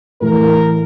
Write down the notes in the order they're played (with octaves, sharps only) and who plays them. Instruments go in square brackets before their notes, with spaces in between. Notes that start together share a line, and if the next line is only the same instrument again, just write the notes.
[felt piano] A2 E3 [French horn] A#4